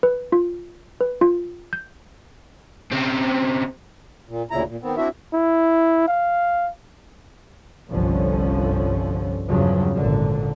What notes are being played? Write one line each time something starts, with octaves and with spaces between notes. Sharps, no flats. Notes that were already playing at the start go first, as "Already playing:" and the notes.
B4
F4
B4
F4
G6
C#3 C4
A#2
D2 A#2 C#3 E4 A#5
A#2
D#3 B3 C4
C4 D4 E4 F#4 E5
E4
F5
G1 C2 D3 F3 C#4
E2 G2 C#3 F3 F#3
G#1 A#2 D3